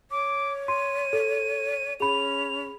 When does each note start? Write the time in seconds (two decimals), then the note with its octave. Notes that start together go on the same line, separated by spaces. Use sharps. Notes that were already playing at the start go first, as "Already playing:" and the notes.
0.11 C#5 D6
0.68 C6 D#7
1.13 A4
2.00 C#4 G#4 B5 F7